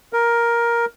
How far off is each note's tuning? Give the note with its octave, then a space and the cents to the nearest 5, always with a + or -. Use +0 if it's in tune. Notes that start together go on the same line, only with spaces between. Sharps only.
A#4 +10